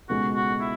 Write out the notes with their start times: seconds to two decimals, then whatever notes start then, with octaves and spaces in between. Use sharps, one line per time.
0.09 C#2 B2 G#3 D#4 F#4 A4
0.36 F#4
0.61 E4